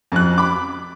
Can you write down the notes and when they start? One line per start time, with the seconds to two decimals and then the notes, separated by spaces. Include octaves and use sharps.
0.12 F2 F3 F#6
0.38 B5 D6